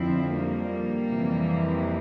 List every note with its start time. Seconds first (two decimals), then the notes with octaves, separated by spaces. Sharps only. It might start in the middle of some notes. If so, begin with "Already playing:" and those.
Already playing: F2 D3 F3 C4 E4
0.35 G3 A#3
1.08 F2 C3 E3